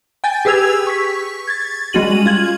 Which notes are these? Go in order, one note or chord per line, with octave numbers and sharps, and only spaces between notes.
G5 G#5 G6 A6
G4 G#4 B4 E6 G#6 F7
C#6 B6
G#6 A6
G3 G#3 C#4 F#4 D#7 F#7
F4 G#6 F#7